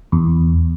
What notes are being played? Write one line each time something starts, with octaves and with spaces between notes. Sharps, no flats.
E2